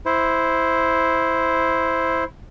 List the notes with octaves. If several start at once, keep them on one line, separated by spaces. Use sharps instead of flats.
E4 C5